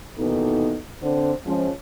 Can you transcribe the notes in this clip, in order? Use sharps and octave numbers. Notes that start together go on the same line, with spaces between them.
D#2 B2 E3 B3 D#4 A4
D3 C4 C5
F3 G#3 C#4